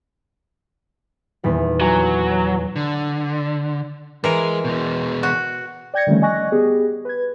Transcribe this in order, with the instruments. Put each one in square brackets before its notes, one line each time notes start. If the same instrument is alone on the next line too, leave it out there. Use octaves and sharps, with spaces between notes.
[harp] D#1 E2 B6
[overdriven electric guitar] F#3 [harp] G#5
[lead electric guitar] D3
[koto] E3 A#4 [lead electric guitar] G#3
[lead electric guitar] B2 G#3
[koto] F#4
[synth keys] D5 G5 G6 G#6 A#6 C#7
D3 D#3 F3 G3 A3 C#4
D5 D#5 G#5 C#6 F#6 A#6
B3 G4 G#4
B4 G#6